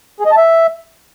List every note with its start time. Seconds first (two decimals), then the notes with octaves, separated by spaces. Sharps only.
0.20 G#4
0.26 D#5
0.31 A5
0.37 E5